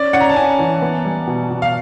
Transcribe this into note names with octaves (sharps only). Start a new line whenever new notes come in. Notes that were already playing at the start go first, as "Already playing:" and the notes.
Already playing: C#4 D5
C#4 F#5
A#5
A5
C#4 G#5
E3
B3
G3
B2
B2
F5